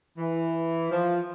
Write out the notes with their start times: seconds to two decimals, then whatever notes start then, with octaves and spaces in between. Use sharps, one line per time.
0.18 E3
0.91 F3